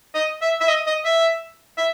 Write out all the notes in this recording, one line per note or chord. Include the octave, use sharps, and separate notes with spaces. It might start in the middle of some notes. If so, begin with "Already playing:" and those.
D#5
E5
E5
D#5
D#5
E5
E5